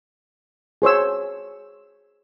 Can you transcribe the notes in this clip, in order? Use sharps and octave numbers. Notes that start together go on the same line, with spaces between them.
G#4 C5 C#5 E6